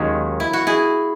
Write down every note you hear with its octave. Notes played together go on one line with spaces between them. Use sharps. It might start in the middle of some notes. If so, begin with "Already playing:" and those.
Already playing: D#2 D#3 F#3 G#3 A#3 C#4
E4
F#4
E4 G#4